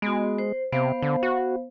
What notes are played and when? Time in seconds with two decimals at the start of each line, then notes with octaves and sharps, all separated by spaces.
0.02 G#3 B3 F#4
0.38 C5
0.72 C3 B3 C5 F5
1.02 D3
1.23 F#4